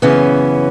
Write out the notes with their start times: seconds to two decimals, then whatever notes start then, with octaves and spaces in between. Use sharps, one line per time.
0.02 F#2 C#3 E3 B3 C#4